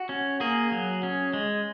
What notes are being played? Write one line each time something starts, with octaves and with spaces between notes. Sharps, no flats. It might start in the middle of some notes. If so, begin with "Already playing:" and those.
Already playing: F#4
C#4
A#3 G#4
F#3
C#4
G#3